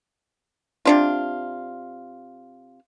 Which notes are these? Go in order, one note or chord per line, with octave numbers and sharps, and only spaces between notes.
C3 D4 F4